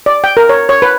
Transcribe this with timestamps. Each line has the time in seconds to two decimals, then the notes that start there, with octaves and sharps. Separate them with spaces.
0.06 D5
0.24 G5
0.37 A#4
0.49 C#5
0.69 C#5
0.82 B4